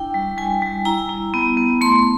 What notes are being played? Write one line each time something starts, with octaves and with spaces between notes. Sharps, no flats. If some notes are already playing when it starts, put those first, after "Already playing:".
Already playing: D4 E4 G5
G3
G3 G#5
G3
E4 A#5
E4
B3
B3
A3 C6